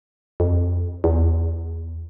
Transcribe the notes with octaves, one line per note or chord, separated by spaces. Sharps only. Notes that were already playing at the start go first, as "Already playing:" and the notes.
F2
E2